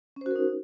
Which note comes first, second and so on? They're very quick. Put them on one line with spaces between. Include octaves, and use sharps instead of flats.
C#4 C5 F#4 A#4 D#4